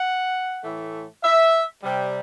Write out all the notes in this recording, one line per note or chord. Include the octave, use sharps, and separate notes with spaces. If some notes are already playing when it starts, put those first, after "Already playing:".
Already playing: F#5
A2 E3 A3
E5
C3 G3